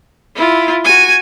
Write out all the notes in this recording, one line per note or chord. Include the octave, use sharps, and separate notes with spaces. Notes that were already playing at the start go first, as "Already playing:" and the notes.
E4 F4
F#4 G#5